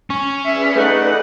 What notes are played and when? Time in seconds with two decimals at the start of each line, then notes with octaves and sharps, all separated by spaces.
0.10 C#4
0.45 G#4 B4 D5 E5
0.75 A3 D#4 F#5